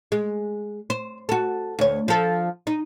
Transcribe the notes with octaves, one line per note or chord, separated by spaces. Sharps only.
G#3
C5
F#4 A4
D2 C#5
F3 A4
D#4